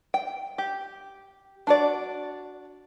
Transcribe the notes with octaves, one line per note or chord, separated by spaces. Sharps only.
G5
G4
D4 F#4 D5